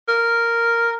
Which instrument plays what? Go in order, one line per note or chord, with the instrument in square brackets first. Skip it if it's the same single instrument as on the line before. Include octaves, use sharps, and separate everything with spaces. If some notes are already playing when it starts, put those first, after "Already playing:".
[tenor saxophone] A#4